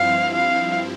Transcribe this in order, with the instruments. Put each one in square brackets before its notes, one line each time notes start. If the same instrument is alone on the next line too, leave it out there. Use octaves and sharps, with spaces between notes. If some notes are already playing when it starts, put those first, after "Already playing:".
Already playing: [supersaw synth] G2 F3 C4 E4 [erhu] F5
[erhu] F5